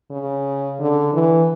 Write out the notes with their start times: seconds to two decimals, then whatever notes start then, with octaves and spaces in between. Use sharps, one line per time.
0.11 C#3
0.80 D3
1.14 E3